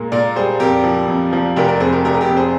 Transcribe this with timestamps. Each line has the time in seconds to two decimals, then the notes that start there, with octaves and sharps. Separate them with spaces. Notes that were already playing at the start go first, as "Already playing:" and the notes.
Already playing: A#2 G#3 A#3
0.12 A#2 A#4 D5
0.36 G3 G#4 C5
0.60 F2 G4 A#4
0.84 F3
1.08 F2
1.33 F3
1.56 F1 G4 A#4
1.68 A#4 D5
1.80 F2 G#4 C5
1.92 G4 A#4
2.04 F1 G4 A#4
2.14 G#4
2.21 G4 A#4
2.29 F2
2.37 G#4 C5